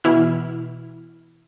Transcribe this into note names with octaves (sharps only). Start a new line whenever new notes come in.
B2 E3 E4 F6